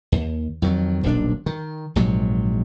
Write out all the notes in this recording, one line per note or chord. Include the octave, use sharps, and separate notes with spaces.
D#2
F2 D#3 F#3
D#1 B1 C3 D4
D#3
A#1 G#2 C3 F#3